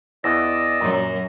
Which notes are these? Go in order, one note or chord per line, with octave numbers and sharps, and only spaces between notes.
E2 E3 D5 D#5 E6 A#6
F#2 A#2 F#3